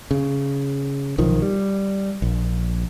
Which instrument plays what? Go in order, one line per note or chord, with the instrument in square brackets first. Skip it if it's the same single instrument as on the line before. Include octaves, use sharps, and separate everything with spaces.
[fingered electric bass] C#3
B1 D#3 F3
G3
A#1